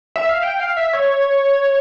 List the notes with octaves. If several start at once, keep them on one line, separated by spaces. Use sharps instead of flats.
E5
F5
G5
F5
E5
C#5